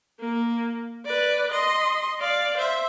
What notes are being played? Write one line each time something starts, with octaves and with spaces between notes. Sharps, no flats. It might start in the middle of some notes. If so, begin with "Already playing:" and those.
A#3
B4 D5
D#5 C6
D5 F5
C5 E5